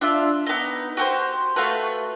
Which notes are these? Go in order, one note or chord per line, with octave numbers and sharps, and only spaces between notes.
D4 F4 E5
B3 D#4
F#4 G4 C5
A3 F4 F#4 B4